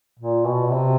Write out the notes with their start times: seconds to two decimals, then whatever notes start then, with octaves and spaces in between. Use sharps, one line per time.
0.19 A#2
0.45 B2
0.71 C3